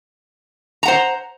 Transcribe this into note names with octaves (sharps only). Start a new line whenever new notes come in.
C5 F#5 A#5